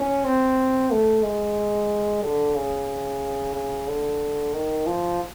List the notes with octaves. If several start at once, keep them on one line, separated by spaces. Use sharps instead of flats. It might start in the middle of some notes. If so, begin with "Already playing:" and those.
Already playing: C#4
C4
A3
G#3
D3
C#3
C#3
D3
D#3
F3